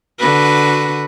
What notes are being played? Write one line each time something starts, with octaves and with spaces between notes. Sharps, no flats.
D3 F#4 B4